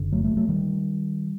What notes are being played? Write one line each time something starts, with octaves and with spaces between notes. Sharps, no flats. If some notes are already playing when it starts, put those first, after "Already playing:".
Already playing: F#1 F#2 D3
F#3 A3
F#3 A3
F#3 A3
D#3 G3